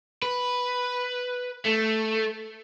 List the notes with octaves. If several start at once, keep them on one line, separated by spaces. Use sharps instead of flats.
B4
A3